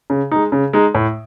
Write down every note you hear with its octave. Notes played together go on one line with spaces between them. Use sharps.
C#3
G#3 D#4
C#3
G#3 D#4
A2